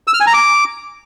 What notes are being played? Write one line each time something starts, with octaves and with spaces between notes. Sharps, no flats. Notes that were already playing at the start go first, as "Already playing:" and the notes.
E6
F6
G#5
A#5
D6